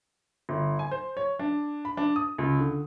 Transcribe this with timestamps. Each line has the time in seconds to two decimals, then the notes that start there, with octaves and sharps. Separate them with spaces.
0.49 G1
0.79 G#5
0.91 C5
1.17 C#5
1.39 D4
1.85 B5
1.97 D4
2.16 D#6
2.38 C#2
2.59 D3